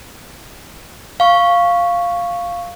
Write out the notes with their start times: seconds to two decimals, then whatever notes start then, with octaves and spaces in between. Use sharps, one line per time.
1.20 F5 C#6